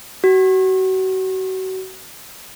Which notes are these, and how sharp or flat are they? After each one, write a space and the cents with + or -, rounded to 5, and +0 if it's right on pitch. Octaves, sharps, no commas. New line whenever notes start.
F#4 +30